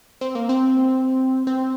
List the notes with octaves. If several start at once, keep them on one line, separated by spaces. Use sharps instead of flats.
C4
A#3
C4
C4